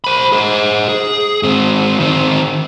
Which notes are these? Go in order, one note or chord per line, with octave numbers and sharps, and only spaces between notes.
C5 B5
G#4 C5
G#4
G#2 C4
D#3 C4